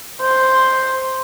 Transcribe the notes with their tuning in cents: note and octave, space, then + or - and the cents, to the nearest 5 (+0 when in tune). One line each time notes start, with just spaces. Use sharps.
C5 +0